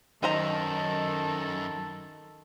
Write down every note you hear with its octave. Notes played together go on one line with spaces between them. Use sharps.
F#2 D#3 D#4 A4 C5 A#5